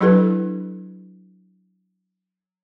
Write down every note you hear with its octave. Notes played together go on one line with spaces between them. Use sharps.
F#3 D4 E4 G4 A4 B4